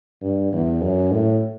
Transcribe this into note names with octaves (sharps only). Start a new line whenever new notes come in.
G2
E2
F#2
A2